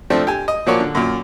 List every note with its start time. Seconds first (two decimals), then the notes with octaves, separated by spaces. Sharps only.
0.10 F3 A3 C4 D4
0.27 G4 G#5
0.48 D#5
0.66 A#2 F3 A#3 F#4 C#5 D5
0.80 D3
0.95 F#2 A#2